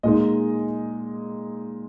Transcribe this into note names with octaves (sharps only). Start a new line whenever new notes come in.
A#2 G#3 D#4 D#5